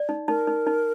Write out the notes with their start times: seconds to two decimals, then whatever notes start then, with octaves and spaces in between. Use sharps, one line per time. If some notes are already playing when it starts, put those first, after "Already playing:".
Already playing: D5
0.09 D#4
0.28 D#4 A#4
0.47 D#4
0.67 D#4